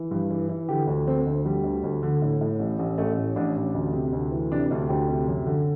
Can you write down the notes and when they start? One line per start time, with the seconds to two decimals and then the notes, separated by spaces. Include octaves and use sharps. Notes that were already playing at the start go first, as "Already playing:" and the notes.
Already playing: E3
0.11 G2
0.30 E3
0.49 E3
0.69 D3 G4
0.87 D2
1.07 D3 C4
1.27 D2
1.45 D3 G3
1.64 D2
1.84 D2
2.03 D3
2.22 A2
2.41 A2
2.59 A1
2.79 A1
2.98 A1 A3
3.18 A2
3.36 A1 D4
3.56 A1
3.74 D2
3.93 C3
4.13 D2
4.32 E3
4.52 C3 D4
4.71 D2
4.89 D2 G4
5.09 C3
5.28 F#2
5.46 D3